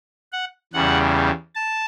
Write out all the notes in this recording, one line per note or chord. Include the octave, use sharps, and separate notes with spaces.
F#5
E2 C#3 G3 F#5
A5